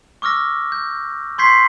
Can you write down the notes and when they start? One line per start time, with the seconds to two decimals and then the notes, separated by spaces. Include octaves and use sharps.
0.22 C#6 D6 E6 F6 A#6
0.72 G6
1.38 C6 C#6 G6 G#6 B6 C7